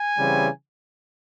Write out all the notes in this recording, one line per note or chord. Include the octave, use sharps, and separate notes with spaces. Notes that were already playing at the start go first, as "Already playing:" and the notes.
Already playing: G#5
C#3 E3 G3 C4